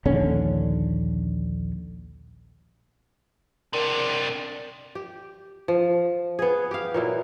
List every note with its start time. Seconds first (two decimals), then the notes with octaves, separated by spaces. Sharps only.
0.05 A#1 D#2 D3 C#4
3.73 C3 D4 A#4
4.95 G4
5.68 F3
6.39 B3 G#4
6.71 G4 F5
6.94 A#2 F#3 E4